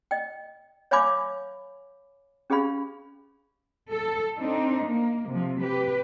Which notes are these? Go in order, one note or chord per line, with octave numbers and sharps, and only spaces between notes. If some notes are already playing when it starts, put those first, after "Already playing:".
D#5 G5
C#5 E5 F5 G#5 B5 D6
C#4 G4 G#4 F5 B5
A4
C4 D4 D#4
A#3
C3 F3
G4 B4